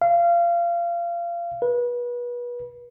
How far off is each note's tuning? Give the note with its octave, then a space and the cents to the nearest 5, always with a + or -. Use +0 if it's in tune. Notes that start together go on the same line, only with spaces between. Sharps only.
F5 -25
B4 -30